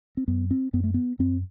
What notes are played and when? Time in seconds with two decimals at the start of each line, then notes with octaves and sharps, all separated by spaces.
0.17 C4
0.28 F#2 B3
0.51 C4
0.73 F#2 B3
0.84 A3
0.94 B3
1.19 F#2 C4